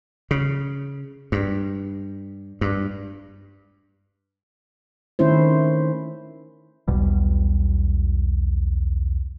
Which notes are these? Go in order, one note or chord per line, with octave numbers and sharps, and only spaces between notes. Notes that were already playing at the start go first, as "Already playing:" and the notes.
C#3
G2
G2
D#3 A3 C#4 E4 C5
B1 E2 B2 G3